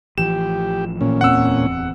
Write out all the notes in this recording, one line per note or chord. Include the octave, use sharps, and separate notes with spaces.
A1 E3 F3 G4 E7
A#2 C#4
D1 E2 C4 F#5 E6